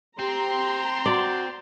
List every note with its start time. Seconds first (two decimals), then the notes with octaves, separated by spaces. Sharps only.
0.19 C4 G4 A#5 C6
1.06 F#4 D5 G5